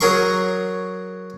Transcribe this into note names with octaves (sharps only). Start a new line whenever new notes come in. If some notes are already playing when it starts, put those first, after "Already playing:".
F#3 G#4 A#4 C6 C#6